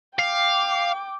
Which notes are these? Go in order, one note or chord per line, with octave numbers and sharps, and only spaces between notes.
F5 G5 D6